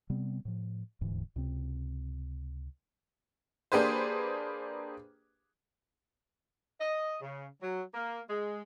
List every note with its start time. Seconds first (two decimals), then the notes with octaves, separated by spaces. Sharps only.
0.10 C3 G3 B3 C4
0.45 A2 F3
1.01 D#1 D2 G#2 E3
1.36 C#2 C3 C4
3.72 A#3 D4 G4 G#4 B4 C5
6.81 D#5
7.21 C#3
7.62 F#3
7.94 A#3
8.30 G#3